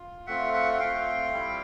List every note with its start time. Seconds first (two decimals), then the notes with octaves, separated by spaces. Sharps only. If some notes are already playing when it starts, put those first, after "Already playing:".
Already playing: F4
0.27 A3 C4 F4 E5 F#5
0.54 E5 F#5
0.73 F#5
0.80 A3 C4 F4 F5 G5
1.33 G3 C4 E4